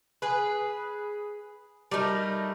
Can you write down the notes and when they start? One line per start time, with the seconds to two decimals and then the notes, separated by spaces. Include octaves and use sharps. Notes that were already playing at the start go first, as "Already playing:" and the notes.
0.22 G#4 B4
1.91 G3 A3 D#4 A#4